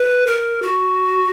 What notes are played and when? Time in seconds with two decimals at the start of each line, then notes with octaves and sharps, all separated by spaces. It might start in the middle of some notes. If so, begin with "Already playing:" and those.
Already playing: B4
0.27 A#4
0.62 F#4